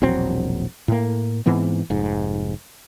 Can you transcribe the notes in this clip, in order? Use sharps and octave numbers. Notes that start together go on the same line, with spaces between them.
E1 A#1 F#3 C4
A2 A#3
G#2 E3 B3 C4
F1 G#2